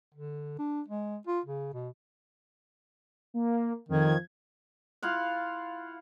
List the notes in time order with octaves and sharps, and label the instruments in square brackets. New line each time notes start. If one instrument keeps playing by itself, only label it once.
[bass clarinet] D3
D4
G#3
F4
C#3
B2
[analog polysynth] A#3
[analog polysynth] F2 G#6 [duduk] D#3
[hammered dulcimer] E4 F4 F5 F#5